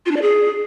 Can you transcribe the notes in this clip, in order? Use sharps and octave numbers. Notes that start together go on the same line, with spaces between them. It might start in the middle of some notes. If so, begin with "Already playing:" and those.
F4
D4
D5
G#4